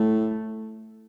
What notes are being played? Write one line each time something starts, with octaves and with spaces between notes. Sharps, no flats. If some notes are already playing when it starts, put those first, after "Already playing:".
Already playing: A2 A3